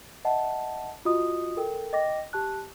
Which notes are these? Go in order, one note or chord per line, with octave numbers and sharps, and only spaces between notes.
D#5 E5 F#5 A5
F4 F#4 D#5 D#6
A4 A#4 G5
D#5 G5 D6 A#6
G4 A5 F#6